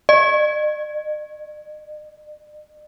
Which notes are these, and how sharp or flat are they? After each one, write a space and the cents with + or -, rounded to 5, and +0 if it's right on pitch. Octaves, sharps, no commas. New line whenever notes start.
D#5 -45